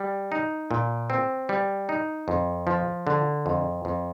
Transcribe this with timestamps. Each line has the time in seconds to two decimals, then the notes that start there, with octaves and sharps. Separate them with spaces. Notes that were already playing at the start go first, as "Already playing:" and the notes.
Already playing: G3
0.32 D#4
0.71 A#2
1.10 C4
1.49 G3
1.89 D#4
2.28 F2
2.67 F3
3.07 D3
3.46 F2
3.85 F2